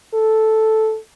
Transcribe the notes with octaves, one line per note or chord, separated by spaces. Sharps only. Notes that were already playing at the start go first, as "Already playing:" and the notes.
A4